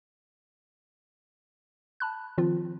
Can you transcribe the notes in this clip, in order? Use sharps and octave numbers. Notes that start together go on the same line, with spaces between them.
A5 B5 F#6
D#3 F3 C4 F4